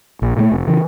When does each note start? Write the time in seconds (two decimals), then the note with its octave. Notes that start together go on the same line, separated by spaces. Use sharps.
0.22 A#1
0.37 A#2 F#3 A3
0.52 F1
0.67 C#3 E3